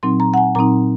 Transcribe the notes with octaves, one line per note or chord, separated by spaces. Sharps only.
A#2 F#3 C4 D#4 C6
A#5
F#5
G#5
A#2 F#3 C4 D#4 A#5